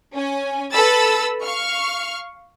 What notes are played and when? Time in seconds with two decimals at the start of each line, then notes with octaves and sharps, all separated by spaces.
0.14 C#4 G#5
0.72 A4 B4 B5 E6 A6
1.43 F5 C#6 F6